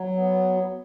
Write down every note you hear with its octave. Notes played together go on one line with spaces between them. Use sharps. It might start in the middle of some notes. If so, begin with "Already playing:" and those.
Already playing: F#3
B3